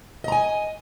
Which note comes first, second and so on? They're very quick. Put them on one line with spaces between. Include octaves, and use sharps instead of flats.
D#5 A#5 G#5